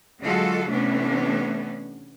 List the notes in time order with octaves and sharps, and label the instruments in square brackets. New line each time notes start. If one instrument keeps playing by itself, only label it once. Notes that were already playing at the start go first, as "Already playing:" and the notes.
[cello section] D3 F#3 G#3 F4 F#4 A4
C3 E3 A3 B3 C#4 D4